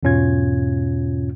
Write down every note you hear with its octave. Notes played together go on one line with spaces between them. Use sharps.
E2 G#2 B2 C#4 F4 G#6